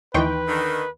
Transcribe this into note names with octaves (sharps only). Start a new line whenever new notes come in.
D#2 E3 D#4 B4 G5 C6 C#6
D3 D#3